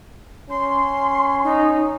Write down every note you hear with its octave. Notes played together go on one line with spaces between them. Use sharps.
C#4 C6
D#4